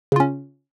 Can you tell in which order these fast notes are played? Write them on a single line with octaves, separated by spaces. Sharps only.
C#3 F4 C#4